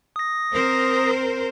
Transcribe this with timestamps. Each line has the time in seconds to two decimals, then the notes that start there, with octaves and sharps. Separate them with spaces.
0.16 D#6 A#6
0.53 C4 A#4 C5